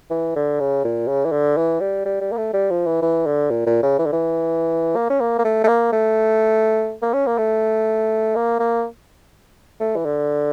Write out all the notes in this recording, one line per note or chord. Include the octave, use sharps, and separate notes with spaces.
E3
D3
C#3
A#2
C#3
E3
D3
E3
G3
G3
G3
A#3
A3
G3
F3
E3
E3
D3
A#2
A#2
C#3
E3
D3
E3
A#3
C#4
A#3
A#3
A3
A3
A#3
A3
A#3
C#4
A#3
A3
A#3
A#3
A3
E3
D3